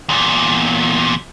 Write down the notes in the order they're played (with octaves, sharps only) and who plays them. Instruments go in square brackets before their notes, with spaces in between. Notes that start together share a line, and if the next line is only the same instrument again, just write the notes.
[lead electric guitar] E2 A#2